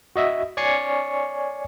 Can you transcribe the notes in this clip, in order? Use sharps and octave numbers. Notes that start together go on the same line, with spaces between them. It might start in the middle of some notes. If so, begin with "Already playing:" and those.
F#4 D#5 E5
C#5 D5 G#5 C#6 C7 C#7